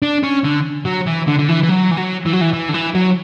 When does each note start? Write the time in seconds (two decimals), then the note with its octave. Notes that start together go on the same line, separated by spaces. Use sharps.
0.02 D4
0.23 C#4
0.44 D3
0.86 F#3
1.07 E3
1.28 D3
1.39 D3
1.49 E3
1.63 E3
1.69 F#3
1.91 E3
1.97 F#3
2.25 E3
2.33 F#3
2.41 E3
2.53 E3
2.69 D3
2.74 E3
2.95 F#3